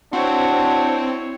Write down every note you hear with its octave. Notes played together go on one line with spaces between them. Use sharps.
C4 D4 E4 F#4 C#5